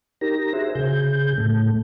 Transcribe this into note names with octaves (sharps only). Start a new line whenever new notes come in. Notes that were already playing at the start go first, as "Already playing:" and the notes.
D#4 G4 A#4 A#6
F#4 G#4 C5 E5
C#3 G#4 G6
A2 A3